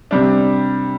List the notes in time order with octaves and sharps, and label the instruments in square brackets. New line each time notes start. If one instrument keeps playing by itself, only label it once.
[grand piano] C3 G3 D4